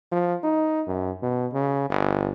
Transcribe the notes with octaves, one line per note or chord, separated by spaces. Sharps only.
F3
D#4
F#2
B2
C#3
G1